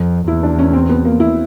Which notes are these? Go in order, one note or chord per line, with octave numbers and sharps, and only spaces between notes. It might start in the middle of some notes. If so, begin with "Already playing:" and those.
Already playing: F2
E2 E4
D4
C#4
C4
B3
A#3
E4